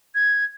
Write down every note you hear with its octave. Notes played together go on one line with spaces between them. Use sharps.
G#6